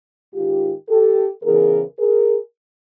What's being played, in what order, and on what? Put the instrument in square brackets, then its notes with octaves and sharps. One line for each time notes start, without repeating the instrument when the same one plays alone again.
[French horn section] G#2 D#3 F4 G4
G4 A4
E2 C#3 E3 G#4 A#4
G#4 A#4